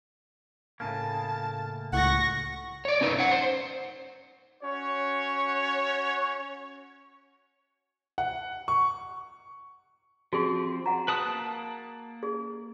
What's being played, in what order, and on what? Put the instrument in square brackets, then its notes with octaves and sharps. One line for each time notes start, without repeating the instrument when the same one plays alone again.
[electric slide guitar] A2 C#3 A#3 [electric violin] A5
[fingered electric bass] C#2 A2 [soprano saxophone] F#5 [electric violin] C#6 A#6
[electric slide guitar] C#5 D5
C#4 D#4 B4
C#5 F#5
C5
[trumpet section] C#4 F#4 C#5
[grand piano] F#5
C#6
[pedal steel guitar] F3 C4 [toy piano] F#4 G#4
[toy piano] F#5 A#5
[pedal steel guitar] B4 A5 D#6
A#3 A5
[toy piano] G#4